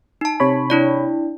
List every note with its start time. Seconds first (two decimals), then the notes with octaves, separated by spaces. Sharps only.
0.21 D#4 A5
0.40 C3 C#5 B5
0.70 D4 E4 D5